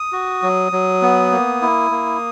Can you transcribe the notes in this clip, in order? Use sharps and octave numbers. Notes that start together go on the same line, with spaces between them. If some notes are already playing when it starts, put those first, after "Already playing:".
Already playing: D#6
F#4
F#3
F#3
B3
A#3
E4
A#3